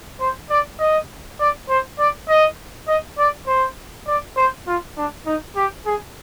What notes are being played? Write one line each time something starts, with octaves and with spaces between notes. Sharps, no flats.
C5
D5
D#5
D5
C5
D5
D#5
D#5
D5
C5
D5
C5
F4
D4
D#4
G4
G#4